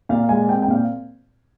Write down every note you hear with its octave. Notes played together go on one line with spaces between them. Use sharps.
A#2 F5
G#3 G#5
C4 G5
G5
A#2 F5